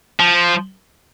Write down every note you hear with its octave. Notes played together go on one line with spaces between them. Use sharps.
F3